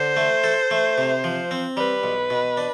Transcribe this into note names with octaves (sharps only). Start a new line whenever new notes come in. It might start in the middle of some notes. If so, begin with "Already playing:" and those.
Already playing: D3 C5
A3
A4
A3
C3
F3
C4
G3 B4
B1
B2
D4